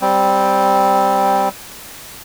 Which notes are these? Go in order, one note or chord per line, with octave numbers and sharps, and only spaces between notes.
G3 C4